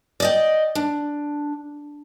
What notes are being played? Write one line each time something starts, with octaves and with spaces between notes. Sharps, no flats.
D5 D#5 G5
D4